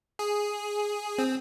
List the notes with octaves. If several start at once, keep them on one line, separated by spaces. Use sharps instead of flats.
G#4
C4